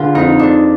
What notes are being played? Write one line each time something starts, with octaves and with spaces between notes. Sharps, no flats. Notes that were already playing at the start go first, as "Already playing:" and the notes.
Already playing: D3 F4 G#4 B4
F2 D#4
F2 D4